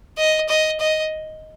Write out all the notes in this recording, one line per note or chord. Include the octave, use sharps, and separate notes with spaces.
D#5
D#5
D#5